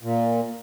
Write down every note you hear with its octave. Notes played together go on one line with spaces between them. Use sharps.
A#2